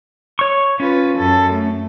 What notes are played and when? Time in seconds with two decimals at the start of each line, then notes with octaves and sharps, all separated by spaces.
0.39 C#5 C#6
0.80 C#4 F4 B4
1.18 F#2 A4
1.53 A3